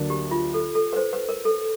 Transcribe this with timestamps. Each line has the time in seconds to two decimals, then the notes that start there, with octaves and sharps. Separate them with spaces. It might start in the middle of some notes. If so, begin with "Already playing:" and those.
Already playing: D2 D3 F#3 A#3 D4
0.10 G4
0.31 F4
0.54 A4
0.75 A4
0.93 B4
0.96 C5
1.13 B4
1.29 A#4
1.45 A4